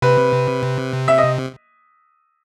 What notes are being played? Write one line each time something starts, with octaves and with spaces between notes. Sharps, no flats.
C3 B4
E5
D#5